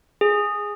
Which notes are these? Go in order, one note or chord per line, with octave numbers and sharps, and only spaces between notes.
G#4